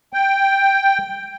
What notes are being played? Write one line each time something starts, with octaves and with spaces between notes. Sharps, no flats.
G5